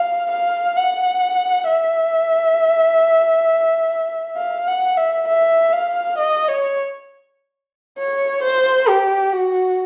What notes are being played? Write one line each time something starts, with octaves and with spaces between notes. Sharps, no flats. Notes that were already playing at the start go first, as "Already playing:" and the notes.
Already playing: F5
F5
F#5
E5
F5
F#5
E5
E5
F5
D#5
C#5
C#5
C5
G4
F#4